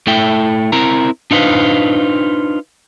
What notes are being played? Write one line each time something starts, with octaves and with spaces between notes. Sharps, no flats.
A3 E4 A4 E5 G5
C4 E4 A#4 A#5
D4 D#4 F4 B4 C5